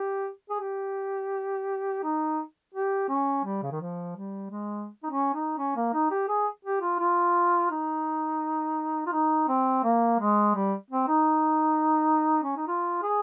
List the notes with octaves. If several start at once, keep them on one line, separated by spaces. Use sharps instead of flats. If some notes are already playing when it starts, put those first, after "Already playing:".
Already playing: G4
G#4
G4
D#4
G4
C#4
G3
C#3
D#3
F3
G3
G#3
D#4
C#4
D#4
C#4
A#3
D#4
G4
G#4
G4
F4
F4
D#4
F4
D#4
C4
A#3
G#3
G3
C4
D#4
C#4
D#4
F4
G#4